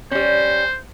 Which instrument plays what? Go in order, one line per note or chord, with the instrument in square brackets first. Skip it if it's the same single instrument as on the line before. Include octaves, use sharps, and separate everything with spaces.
[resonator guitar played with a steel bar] G3 C#4 [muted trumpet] C5